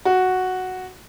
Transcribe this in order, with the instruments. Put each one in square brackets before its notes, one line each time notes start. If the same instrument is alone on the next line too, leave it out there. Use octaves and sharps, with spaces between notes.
[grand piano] F#4